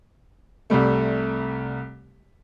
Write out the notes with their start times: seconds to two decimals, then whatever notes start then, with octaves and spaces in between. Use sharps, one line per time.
0.70 C2 C3 G3 A3